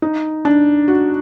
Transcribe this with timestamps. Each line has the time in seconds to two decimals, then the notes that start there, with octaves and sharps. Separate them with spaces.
0.02 D#4
0.45 D4
0.88 F#4